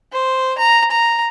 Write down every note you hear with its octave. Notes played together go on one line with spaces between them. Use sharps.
C5
A#5
A#5